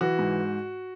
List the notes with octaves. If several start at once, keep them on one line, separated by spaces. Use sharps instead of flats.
E3 F#4
G#2